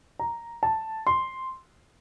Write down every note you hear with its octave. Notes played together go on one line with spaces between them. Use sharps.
A#5
A5
C6